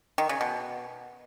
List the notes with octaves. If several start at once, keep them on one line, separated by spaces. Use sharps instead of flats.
D#3
C#3
B2